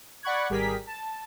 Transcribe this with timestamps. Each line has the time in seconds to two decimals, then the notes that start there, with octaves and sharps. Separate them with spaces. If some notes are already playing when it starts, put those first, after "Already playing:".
0.23 D5 F#5 B5 C#6 F#6 G#6
0.50 G#1 G3 G4 G#4 A#4 B6
0.87 A5